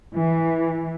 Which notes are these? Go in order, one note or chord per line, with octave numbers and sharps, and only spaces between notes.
E3